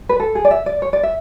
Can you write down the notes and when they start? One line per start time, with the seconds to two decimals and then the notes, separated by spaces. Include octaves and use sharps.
0.09 B4
0.20 A4
0.35 G#4
0.45 D5
0.51 E5
0.66 D5
0.82 C#5
0.93 D5
1.03 E5